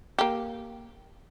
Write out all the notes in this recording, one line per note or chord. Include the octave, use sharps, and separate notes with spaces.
A#3 G4